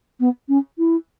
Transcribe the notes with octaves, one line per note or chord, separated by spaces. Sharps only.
B3
C#4
E4